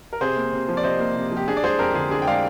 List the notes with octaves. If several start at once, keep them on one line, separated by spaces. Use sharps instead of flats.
A#4
C3 G#4 C5
A#3
C3
F3
D5
C3 C5 D#5
A#3
C3
F3
G4
D4 G#4
D5
G#3 G#4 C5
F2 G4 A#4
D3 G#4
D4 G#4
G5
G#3 D5 F5